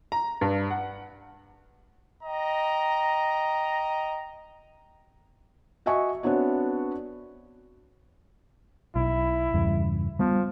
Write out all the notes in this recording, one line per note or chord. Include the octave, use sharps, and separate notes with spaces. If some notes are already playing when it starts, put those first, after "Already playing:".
A#5
G2
F#5
D#5 G5 A#5
F#4 D#5 E5 G#5 C#6
B3 C4 D4 F#4 C#5
B1 E4
E2 G2 C#3
F3 G3 B3